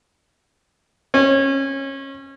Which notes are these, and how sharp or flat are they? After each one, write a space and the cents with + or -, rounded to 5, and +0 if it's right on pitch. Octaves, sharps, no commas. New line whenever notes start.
C#4 -25